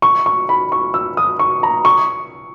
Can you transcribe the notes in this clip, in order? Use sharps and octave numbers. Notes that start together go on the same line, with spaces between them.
C#6
C#6
B5
C#6
E6
D#6
C#6
A#5
C#6